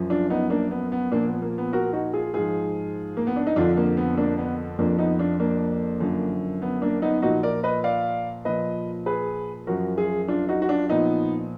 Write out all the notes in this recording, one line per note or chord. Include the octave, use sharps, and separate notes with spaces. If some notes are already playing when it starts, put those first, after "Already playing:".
Already playing: F#2 F3
D4 F4
B3 D#4
A#3 D4
B3
B3
A#2 F3 A#3 D4
B3
A#3
B3
F#4 A#4
D#4 F#4
F4 G#4
G#2 F3 F4 G#4
A#3
B3
D4
D#4
F2 D3 F3 D4 F4
A#3
B3
A#3 D4
B3
F2 F3 A#3 D4
B3 D#4
D4 F4
A#3 D4
F#2 D3 F3
B3
A#3 D4
B3 D#4
A#2 F3 D#4 F#4
A#4 D5
B4 D#5
D5 F5
A#2 F3 B4 D#5
G#4 B4
F#2 F3 F#4 A#4
F4 G#4
D4 F4
D#4 F#4
F#4
D4 F4
A#2 F3 B3 D#4